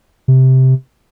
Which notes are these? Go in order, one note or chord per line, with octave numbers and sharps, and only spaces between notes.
C3